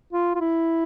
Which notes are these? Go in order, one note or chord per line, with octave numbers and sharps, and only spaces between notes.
F4
F4
E4